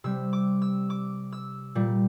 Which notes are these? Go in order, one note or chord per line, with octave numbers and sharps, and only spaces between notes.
C3 G3 E6
D6
E6
D6
E6
A#2 G3